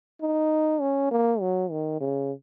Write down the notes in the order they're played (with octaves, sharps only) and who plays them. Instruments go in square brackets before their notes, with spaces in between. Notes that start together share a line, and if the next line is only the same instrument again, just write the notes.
[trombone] D#4
C#4
A#3
F#3
D#3
C#3